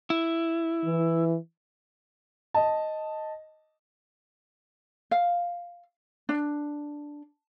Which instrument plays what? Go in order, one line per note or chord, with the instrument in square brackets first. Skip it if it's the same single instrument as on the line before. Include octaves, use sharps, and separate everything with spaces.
[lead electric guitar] E4
[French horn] E3
[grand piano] D#5 A5
[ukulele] F5
D4